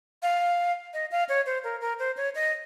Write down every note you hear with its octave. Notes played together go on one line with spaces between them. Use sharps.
F5
D#5
F5
C#5
C5
A#4
A#4
C5
C#5
D#5